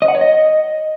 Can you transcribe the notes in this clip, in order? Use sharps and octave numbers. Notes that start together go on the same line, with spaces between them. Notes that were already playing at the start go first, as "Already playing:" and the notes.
D#5
F#5
C#5
D#5